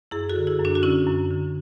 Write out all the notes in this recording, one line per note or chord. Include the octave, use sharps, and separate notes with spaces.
F#2 E4 G#4
F#4 A4
D3
E4 G#4
F#2
D4 F#4
F#4
D3 C#4 E4
F#2
D3